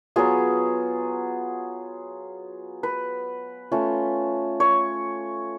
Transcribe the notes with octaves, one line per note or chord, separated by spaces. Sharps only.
F#3 B3 F4 G#4
B4
A3 C#4 F4
C#5